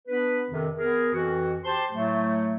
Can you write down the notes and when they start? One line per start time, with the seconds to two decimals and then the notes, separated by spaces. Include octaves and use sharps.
0.08 B3 D4 B4
0.51 F2 C3 D#3
0.76 B3 G#4 A#4
1.14 F2 E3 F#4
1.65 G4 C5 A5 C6
1.91 A2 F#3 A3